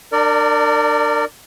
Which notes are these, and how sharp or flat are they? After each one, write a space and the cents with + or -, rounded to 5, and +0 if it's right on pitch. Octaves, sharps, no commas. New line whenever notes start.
D4 +35 A#4 -25 D5 +0